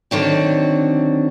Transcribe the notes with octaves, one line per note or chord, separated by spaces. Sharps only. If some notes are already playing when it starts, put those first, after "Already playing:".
D3 D#3 F#3 C4